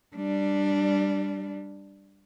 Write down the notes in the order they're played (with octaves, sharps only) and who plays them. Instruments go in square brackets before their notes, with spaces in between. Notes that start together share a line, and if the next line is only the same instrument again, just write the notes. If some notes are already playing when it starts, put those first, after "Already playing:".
[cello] G3 D4